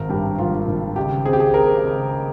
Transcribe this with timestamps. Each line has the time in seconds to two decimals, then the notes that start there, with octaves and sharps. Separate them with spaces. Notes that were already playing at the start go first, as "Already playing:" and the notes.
Already playing: G#1 A#4
0.09 G2 G4
0.38 G#1 F4
0.67 G#1
0.96 C#2 G4
1.26 C4 G#4
1.33 G4
1.40 G#4
1.54 C4 A#4
1.83 C#2